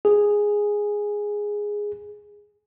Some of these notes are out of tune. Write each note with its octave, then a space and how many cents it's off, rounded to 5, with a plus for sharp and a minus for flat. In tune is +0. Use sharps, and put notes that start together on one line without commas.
G#4 -5